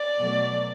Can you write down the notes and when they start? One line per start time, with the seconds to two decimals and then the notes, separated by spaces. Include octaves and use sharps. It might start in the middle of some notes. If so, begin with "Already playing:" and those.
Already playing: D5
0.19 B2 F#3 A3